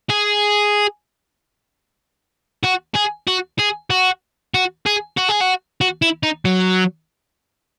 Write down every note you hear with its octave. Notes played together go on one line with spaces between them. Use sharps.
G#4
F#4
G#4
F#4
G#4
F#4
F#4
G#4
F#4
G#4
F#4
F#4
E4
D#4
F#3